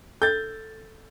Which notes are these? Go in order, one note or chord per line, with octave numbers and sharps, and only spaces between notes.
A4 G6 A6